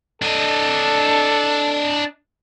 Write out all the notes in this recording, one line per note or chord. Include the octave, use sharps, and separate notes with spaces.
D4 A4 D#5